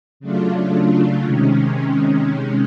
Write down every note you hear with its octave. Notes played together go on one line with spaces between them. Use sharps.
C#3 F#3 A3 D4 F4
C3 D#3 G#3 C#4